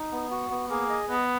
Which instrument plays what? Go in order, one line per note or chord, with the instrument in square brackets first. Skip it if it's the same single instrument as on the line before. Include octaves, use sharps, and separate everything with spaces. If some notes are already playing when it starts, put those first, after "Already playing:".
Already playing: [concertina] D#4
B3
F#4
B3
[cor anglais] A#3 [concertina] G#4
[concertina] D#5
[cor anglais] B3 [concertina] D#5